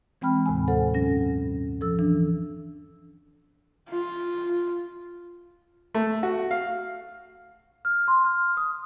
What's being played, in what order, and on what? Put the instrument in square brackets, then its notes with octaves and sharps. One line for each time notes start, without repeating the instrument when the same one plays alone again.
[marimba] E3 G#3 C4 G5 B5 F6
D#2 A2 C3 G#5
A4 C5 F#5
G2 F#3 C#4 A#6
F3 A4 E6
E3 D4
[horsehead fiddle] F4
[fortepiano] A3
F#4
F5
[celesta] F6
C6
F6
D#6